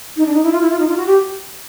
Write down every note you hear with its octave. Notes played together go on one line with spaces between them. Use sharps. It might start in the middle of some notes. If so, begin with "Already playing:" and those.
D#4
D4
D#4
E4
F4
E4
F4
D#4
F4
F#4
G4